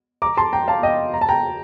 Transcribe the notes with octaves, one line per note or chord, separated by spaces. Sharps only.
A#5 D6
A5 C6
G5 A#5
F5 A5
D#5 G5
A#5
A5
G5 A#5